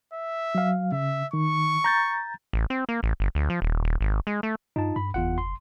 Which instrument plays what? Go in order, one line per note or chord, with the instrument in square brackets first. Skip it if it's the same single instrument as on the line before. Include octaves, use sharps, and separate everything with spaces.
[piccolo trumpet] E5
[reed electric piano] F#3 F5
[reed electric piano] C#3 [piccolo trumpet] E5
[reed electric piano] D#3 [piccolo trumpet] C#6
[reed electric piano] A#5 G6 A6
[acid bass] A1
C4
A#3
A1
G1
D2
F3
D#1
D#1
G#1
G#3
A3
[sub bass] G2 [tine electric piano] D#4 F4 A5
[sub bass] G2 [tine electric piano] B5
[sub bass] F#1 [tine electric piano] E2 F4 F#5
[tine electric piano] C6